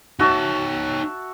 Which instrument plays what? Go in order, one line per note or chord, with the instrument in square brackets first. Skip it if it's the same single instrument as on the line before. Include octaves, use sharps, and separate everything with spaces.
[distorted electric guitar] D#4 C#5 [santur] F#4 E5 A5